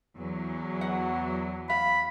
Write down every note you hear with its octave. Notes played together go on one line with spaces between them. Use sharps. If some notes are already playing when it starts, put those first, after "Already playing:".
E2 F#3
F#5
F5 B5